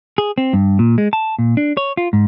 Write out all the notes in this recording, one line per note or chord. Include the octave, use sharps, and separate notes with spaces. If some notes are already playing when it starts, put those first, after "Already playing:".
G#4
C4
G2
A#2
G#3
A5
A#2
D4
C#5
F4
G#2